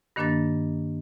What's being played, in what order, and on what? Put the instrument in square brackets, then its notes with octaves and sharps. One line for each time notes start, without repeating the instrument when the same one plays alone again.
[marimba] G2 D#3 A#3 D4 A#4 A6